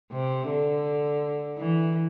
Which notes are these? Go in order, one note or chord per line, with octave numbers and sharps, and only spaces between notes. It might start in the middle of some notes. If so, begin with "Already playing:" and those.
C3
D3
E3